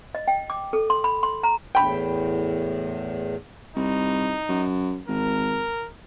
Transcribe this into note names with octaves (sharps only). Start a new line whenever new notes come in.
D#5
G5
D6
A4
C6
B5
C6
A#5
E2 A2 G5 B5
C2 D#4
F#2
G#1 A#4